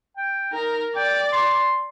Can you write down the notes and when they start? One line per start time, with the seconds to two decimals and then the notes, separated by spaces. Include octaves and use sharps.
0.17 G5
0.53 D#4 A#4
0.96 D5 G5
1.33 C6